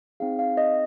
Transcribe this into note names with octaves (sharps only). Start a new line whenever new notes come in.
C4 D#4 G#4 F5
F5
D#5